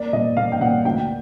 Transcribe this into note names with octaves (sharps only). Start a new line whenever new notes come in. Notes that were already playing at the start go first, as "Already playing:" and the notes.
Already playing: A#3 D5
A#2 D#5
A#2 F5
G5
A#2 F#5
D2 G5